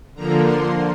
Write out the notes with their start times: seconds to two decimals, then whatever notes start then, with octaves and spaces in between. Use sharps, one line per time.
0.15 D3 F3 A#3 A#5
0.44 C6